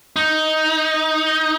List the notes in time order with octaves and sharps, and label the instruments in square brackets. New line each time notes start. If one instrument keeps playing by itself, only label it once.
[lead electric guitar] D#4